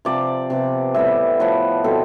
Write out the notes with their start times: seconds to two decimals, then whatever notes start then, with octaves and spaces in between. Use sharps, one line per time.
0.05 C3 F3 C4 D5
0.50 C3 F3 B3
0.94 A2 G3 B3 E5
1.39 A2 F3 B3 B4
1.84 B2 G3 C4 A4